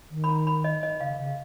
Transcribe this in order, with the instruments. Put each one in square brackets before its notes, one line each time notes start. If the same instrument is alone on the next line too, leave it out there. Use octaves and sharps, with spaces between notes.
[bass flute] D#3
[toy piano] B5
A#5
B5
D#5
D#5
[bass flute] C#3 [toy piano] F5
[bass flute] C#3